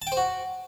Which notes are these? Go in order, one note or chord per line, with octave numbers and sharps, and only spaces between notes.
A5
G5
C5
F#4